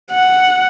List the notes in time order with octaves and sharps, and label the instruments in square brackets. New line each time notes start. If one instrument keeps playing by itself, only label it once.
[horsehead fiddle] F#5